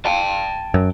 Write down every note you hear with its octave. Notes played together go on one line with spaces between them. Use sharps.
G5 A5
F#2